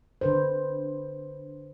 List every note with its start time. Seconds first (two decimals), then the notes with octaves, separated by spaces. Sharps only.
0.21 D3 B4 C5